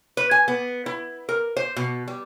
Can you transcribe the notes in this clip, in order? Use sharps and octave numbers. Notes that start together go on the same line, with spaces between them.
B4
G#5
B3
E4
A#4
C5
B2
G3